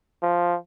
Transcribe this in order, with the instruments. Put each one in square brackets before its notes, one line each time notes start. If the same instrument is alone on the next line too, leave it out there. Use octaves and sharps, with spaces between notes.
[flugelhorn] F3